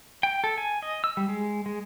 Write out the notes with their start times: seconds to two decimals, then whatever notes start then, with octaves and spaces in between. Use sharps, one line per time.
0.23 G5
0.44 A4
0.58 G#5
0.82 D#5
1.04 E6
1.17 G3
1.28 G#3
1.66 G#3